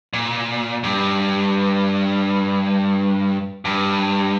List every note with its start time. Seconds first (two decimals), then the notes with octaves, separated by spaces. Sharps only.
0.13 A#2
0.84 G2
3.65 G2